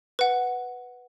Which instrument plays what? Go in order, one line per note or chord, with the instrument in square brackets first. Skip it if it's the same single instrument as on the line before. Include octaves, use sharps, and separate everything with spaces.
[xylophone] B4 F#5